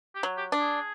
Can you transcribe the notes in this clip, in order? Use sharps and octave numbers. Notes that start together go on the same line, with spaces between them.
G4
F#3
G4
D4
G#4